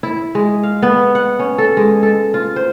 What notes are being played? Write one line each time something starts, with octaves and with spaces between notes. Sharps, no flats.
E4
G#3
F5
B3
F#5
C#4
A4
G#3
A4
F4
C5